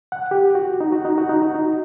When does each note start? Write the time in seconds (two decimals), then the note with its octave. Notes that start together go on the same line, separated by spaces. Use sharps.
0.12 F#5
0.31 G4
0.55 F#4
0.80 D#4
0.92 F#4
1.05 D#4
1.18 F#4
1.29 D#4
1.42 F#4
1.55 D#4